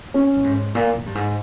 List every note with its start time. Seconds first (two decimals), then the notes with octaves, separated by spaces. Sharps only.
0.14 C#4
0.36 A#2
0.44 G#2
0.75 A#2
0.95 A#2
1.06 G2
1.15 G#2